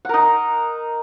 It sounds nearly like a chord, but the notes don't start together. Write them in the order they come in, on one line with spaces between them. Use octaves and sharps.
F#5 A#4 D#4